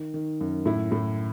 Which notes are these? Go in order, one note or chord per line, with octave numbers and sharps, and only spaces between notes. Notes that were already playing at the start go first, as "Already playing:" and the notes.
Already playing: D#3
D#3
F#2
A2 E4
A2